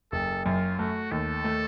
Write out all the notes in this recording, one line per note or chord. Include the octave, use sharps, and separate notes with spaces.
F#1 A4
F#2 F4
A3 F#4
D#2 A4
A3